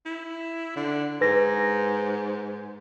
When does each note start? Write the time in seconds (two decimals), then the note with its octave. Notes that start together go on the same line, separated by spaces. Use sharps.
0.06 E4
0.76 D3
1.21 G#2 B4 A#6